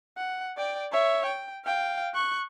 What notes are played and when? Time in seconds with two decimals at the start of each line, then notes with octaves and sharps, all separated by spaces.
0.18 F#5
0.57 D5 G5
0.92 C#5 E5
1.26 G5
1.65 F5 G5
2.14 C#6 F#6